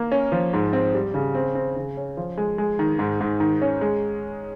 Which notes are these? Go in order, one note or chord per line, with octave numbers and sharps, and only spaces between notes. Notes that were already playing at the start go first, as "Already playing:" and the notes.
Already playing: A#3
C#4
F3
G#2
C4
G3
C#3
C4
C4
C#3
C#4
F3
G#3
G#3
D#3
G#2
G#2
D#3
C#4
G#3